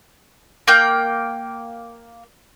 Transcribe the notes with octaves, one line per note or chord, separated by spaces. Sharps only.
A#3 G5